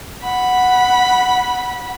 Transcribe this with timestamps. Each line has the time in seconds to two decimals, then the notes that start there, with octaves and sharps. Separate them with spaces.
0.23 F#5 B5